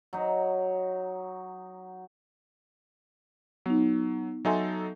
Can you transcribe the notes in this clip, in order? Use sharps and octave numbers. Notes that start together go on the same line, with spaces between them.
F#3 D#4
F#3 B3 D#4
F#3 D#4 A4 E5 G#5 C6